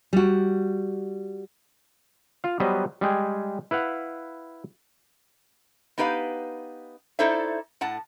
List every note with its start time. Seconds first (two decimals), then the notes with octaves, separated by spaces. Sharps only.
0.13 G3 F#4
2.44 F4 F5
2.60 F#3 G3 B3 B4 C5 D#5
3.01 G3 G#3 G#4 G5
3.71 E4 B4 F5 F#5
5.98 B3 D#4 G4 B4 D#5 F5
7.19 D#4 E4 A4 C5 D5 E5
7.81 A2 F#5 A5